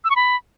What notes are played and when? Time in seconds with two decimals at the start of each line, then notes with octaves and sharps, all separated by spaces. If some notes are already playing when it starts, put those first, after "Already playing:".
0.04 E6
0.10 C#6
0.16 B5